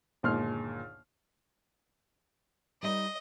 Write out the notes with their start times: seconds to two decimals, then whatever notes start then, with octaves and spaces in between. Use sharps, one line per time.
0.23 G1 D#2 A#2 G#3 C6 F6
2.83 G3 D#4 B4 D#5